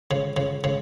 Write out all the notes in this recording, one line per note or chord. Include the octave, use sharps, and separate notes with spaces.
C#3
C#3
C#3